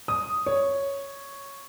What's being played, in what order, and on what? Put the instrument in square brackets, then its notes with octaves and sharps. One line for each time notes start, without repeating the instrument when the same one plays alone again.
[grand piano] D#6
C#5